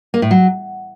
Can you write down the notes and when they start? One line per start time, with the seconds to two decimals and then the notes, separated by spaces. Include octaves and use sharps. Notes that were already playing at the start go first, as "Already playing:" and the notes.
0.14 A#3
0.22 A2
0.31 F#3